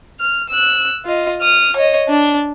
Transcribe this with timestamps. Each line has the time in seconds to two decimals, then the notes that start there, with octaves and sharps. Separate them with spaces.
0.20 F6
0.49 E6 F#6
1.06 F4 D#5
1.41 D#6 F6
1.76 C#5 D#5
2.09 D4